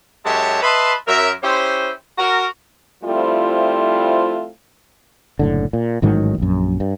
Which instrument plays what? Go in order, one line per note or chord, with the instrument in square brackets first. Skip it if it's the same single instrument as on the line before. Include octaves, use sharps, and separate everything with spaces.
[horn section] F#2 G#3 G4 C#5 E5 A5
B4 D#5 E5 A5 B5 C6
F#2 A#4 E5
C#4 E4 G4 C5
F#4 A#4
[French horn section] F3 G3 A3 C4 E4 F4
[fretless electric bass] F#1 A2 D3
A#2
A1 G#2 D#3 F#3
A#1 F#2
G2